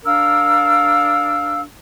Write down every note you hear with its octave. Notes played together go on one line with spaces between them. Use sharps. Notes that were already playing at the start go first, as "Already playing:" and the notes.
D4 A#4 F5 E6